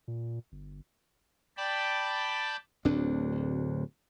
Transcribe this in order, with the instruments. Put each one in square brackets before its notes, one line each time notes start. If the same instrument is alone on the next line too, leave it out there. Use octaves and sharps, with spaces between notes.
[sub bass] A#2
G1
[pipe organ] D5 G5 A5 B5
[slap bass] D1 D2 C4 D4